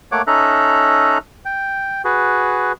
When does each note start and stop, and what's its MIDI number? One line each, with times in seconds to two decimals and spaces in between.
0.12 0.22 57
0.12 0.22 58
0.12 0.22 73
0.12 0.22 78
0.12 0.22 86
0.27 1.18 61
0.27 1.18 63
0.27 1.18 69
0.27 1.18 76
0.27 1.18 82
0.27 1.18 90
1.45 2.02 79
2.05 2.72 66
2.05 2.72 68
2.05 2.72 71